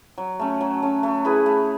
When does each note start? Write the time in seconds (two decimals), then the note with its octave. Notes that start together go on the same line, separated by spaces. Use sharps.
0.18 F#3
0.40 A3 C#4
0.61 F#3
0.82 A3 C#4
1.03 A3
1.25 E4 G#4 B4
1.46 A3